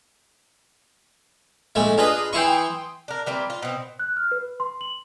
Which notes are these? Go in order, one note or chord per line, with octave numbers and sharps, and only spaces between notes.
A#1 G#3 A3
D4 F4 G#4 B4 D#5
E3 E4 G5 C6 C#6 D#6
D4 A#4
E3 G3 A#3 C4
F4
B2 C4
F#6
F6
B4
C6
F#7